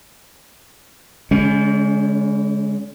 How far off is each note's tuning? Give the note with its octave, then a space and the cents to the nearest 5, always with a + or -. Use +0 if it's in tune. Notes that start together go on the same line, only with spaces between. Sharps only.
D3 -45 G#3 +0 C#4 +0